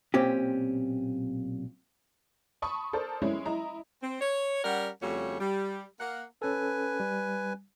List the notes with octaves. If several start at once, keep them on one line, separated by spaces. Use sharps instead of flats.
B1 A#2 C4 C#4 G4
A5 B5 C#6 D#6
A4 A#4 C5 D5
G#3 C#4 E4
E4 D#5 A#5
C4
C#5
G3 C#4 A#4 D5 F#5
F2 C#3 G3 A3 F#4 C#5
G3
A#3 F#5
C#4 A4 B4 G#5
G3